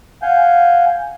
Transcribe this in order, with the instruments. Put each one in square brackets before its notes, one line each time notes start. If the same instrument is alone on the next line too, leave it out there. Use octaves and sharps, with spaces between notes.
[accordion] F5 F#5 G#5 G6